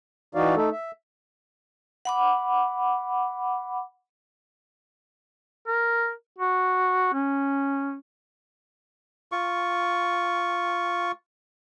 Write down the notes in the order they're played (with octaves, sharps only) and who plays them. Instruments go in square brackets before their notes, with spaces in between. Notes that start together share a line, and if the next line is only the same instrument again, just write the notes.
[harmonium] E3 D#4 F#4 D5 F5
A3 D#4 A4
E5
[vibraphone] F#5 B5 D6
[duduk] A#4
F#4
C#4
[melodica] F4 C#6